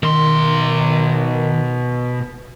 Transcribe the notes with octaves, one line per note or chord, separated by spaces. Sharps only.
B2 D#3 C6